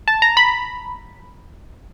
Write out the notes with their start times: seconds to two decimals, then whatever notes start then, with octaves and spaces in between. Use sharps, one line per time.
0.08 A5
0.22 A#5
0.37 B5